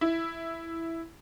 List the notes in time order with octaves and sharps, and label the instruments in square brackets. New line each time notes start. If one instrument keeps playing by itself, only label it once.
[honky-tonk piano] E4